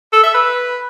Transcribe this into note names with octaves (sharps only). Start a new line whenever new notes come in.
A4
E5
B4